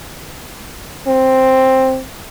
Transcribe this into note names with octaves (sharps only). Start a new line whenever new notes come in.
C4